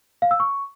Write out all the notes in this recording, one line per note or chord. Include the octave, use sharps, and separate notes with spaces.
F5
E6
C#6